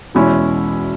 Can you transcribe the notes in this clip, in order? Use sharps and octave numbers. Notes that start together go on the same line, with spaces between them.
E2 B2 G#3 C#4 E4